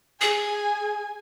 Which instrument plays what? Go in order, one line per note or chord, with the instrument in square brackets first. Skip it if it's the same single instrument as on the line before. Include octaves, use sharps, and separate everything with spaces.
[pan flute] G#4 [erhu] G#5